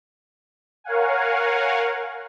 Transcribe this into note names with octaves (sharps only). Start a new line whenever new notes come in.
A#4 C#5 F5 F#5 G#5